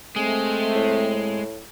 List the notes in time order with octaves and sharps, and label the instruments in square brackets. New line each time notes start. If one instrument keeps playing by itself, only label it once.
[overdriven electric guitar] G#3 [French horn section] A3 C4 [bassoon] G#4
[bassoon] A2